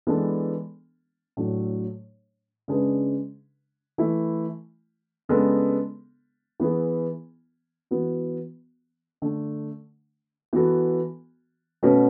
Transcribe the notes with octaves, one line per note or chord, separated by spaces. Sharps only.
E3 G#3 B3 D4 A4
A2 F#3 A3 D4 A4
C#3 G#3 D4 G#4 B4
E3 A3 E4
C#3 G#3 B3 D4 A4
E3 B3 E4 G#4
E3 B3 F#4
D3 A3 D4
E3 B3 F#4 A4
B2 A3 C#4 F#4 B4